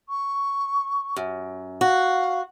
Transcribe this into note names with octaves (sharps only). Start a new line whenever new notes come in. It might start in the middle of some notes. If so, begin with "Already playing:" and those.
C#6
F#2
F#4 F5